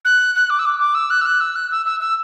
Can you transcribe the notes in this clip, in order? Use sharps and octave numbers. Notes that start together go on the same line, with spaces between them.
F#6
F#6
D6
E6
D6
D6
E6
F#6
E6
F#6
E6
F#6
E6
E6
E6